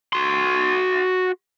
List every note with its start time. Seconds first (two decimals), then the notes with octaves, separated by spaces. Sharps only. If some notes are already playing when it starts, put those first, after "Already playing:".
0.13 F#4 C6